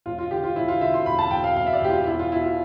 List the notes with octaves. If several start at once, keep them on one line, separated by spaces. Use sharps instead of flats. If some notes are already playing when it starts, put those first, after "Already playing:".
E1 F4
F4
D3 G4
F4
E1 E4
F4
D3 E5
C6
E1 B5
A5
E1 G5
F5
E1 F5
E5
D5
E1 G4
F4
E2 E4
F4
B2 E4
F4